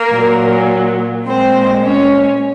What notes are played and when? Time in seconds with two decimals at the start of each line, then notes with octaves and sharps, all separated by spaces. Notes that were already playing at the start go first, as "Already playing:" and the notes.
Already playing: A#3 A#4
0.10 A#2 F#3
1.26 A#2 G#3 C4 C5
1.84 C#4 C#5